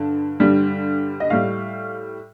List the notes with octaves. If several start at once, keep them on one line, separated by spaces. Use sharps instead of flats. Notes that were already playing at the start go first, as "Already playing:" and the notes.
Already playing: G2 D3 A5
G2 D3 G3
D#5
A2 G3 F5